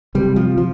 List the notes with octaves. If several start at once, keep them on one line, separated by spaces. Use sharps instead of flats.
C3 G3
F3
F3